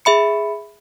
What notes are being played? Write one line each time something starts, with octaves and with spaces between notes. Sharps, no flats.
G#4 E5 B5 C#7